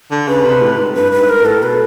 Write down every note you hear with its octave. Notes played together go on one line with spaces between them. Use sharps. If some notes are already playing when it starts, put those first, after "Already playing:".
D3
C#3 B4
C3
A2
G#2
G2 B4
B4
G#2
A#4
A2
A4
B2 B4